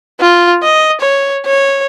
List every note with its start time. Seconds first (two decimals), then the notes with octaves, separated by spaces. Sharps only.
0.20 F4
0.63 D#5
1.01 C#5
1.46 C#5